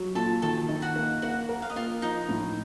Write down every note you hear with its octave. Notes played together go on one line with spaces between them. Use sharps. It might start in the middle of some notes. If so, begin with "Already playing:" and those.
Already playing: F#3
A#2 A4 A5
D#3 A4 A5
D#4
F#4 F#5
A#3
A#3 F#4 F#5
A#4
F5
D#5
A#3 F4 F5
F3 D#4 D#5
A2